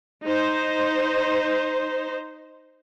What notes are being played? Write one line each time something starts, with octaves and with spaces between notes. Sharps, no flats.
D#4 C5